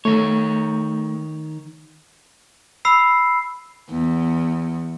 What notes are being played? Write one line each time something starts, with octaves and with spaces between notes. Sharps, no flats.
D#3 A3 C#5
B5 E6 C7
E2